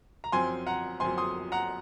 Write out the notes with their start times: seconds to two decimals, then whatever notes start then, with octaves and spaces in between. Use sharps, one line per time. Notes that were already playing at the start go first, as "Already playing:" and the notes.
0.24 A#5
0.32 F#2 F3 C4 G#5 C6
0.67 F#5 A#5
1.00 F#2 F3 C4 G#5 C6
1.18 C6 D#6
1.52 F#5 A#5